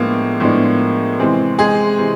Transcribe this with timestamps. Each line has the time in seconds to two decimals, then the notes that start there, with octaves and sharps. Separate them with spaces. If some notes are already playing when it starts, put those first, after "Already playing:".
Already playing: A2 F3 G#3 A#3 B3 D4
0.40 A2 F3 G#3 B3 D4
1.18 C3 E3 G#3 C4
1.58 G#3 G#4
1.98 C3 E3